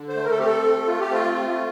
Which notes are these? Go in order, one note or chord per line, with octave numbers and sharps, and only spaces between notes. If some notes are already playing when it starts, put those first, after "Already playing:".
Already playing: D3
C5
A3
A#4
A4
C4 G4
A4
A3
A3 F4
G4
C4 F4
A3